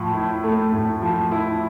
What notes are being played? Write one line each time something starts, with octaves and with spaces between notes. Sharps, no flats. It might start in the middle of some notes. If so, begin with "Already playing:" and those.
Already playing: A2 F3 A3
E4
A3
A2
F3
E4